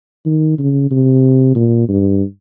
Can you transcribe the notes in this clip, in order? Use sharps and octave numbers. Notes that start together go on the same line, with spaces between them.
D#3
C#3
C3
A#2
G2